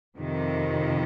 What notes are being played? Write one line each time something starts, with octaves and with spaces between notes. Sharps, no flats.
F2 C3 D#3